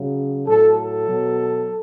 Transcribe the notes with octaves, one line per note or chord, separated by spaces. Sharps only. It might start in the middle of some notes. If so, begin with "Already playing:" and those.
Already playing: C#3 F#3
A2 F#3 A4
A4
B2 F#3